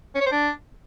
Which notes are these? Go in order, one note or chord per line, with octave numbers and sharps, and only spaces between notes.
C#4
C#5
C5
D4